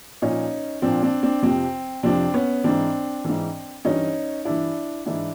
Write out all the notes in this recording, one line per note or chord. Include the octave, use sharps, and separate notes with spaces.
A#2 F3 C#4 D#4
A#2 F3 C4 D4
C4 D4
C4 D4
F2 C3 F3 C4
F2 C3 F3 C4 D4
B3 C#4
G#2 E3 C4 D4
G#2 E3
G2 E3 C#4 D#4
G2 E3 D4 E4
G#2 E3 D4 E4